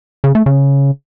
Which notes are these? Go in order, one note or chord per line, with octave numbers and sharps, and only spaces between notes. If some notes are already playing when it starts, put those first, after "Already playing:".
C#3
A3
C#3